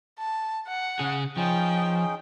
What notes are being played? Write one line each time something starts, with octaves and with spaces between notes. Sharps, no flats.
A5
F#5
C#3 G#4
F3 C#4 D#4 G#4 G5